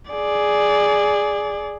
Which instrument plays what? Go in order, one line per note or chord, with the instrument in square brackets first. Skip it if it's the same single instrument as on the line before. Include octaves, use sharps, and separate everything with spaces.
[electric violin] G#4 D5